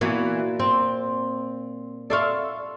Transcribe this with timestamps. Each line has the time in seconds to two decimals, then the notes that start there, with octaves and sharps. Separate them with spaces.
0.01 A#2 E3 B3 F#4
0.60 C4
2.10 A4 D5 E5 F5 C6 C#6